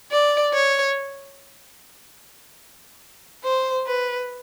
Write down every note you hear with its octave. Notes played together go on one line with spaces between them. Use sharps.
D5
C#5
C5
B4